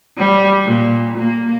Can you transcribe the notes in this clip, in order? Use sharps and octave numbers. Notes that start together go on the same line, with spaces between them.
G3
A#2
A#3